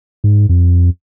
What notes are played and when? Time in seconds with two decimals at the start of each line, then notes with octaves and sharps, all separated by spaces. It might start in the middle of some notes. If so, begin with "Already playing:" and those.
0.24 G#2
0.49 F2